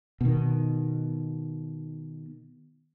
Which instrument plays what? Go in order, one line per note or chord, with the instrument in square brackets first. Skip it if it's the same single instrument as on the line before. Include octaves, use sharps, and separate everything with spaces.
[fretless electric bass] B2 D#3